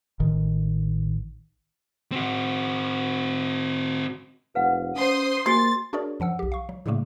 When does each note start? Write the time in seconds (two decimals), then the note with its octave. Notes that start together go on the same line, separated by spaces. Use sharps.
0.20 A1 D#3
2.12 C4 F#4
4.55 F1 B4 F5 F#5
4.96 C#4 C5 C6 D#6
5.46 A#3 F#4 G#4 G#5 C6 A6
5.93 D4 F#4 G#4 A#4 C#5 D5
6.20 F#2 F3 F#5 E6
6.39 B1 G4
6.52 F5 C#6
6.69 F#3
6.86 A2 C#3 F#3 G3 A3 A#3